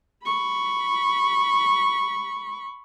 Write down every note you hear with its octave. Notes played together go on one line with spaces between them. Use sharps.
B5 C#6